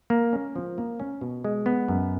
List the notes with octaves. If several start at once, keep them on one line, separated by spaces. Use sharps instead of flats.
A#3
C#4
F3
A#3
C#4
B2
G#3
B3
F#2